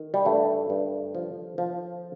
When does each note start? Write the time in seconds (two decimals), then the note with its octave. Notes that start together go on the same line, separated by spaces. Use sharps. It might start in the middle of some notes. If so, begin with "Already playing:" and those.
Already playing: D#3
0.14 G3
0.25 G2 A3
0.70 G2
1.15 F3
1.58 F3